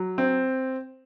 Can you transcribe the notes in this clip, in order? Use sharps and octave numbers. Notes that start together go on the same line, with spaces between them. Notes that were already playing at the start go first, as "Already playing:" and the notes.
Already playing: F#3
C4